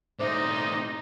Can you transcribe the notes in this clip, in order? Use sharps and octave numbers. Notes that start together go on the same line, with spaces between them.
A2 C4 D#4 C5 D5 E5